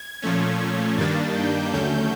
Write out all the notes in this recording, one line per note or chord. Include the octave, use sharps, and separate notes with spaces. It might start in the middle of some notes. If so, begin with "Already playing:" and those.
Already playing: G#6
A#2 F3 A3 C#4
G2 D#3 G3 A#3 D4 A6
G6
D#2 D3 F#3 A3 C#4 G6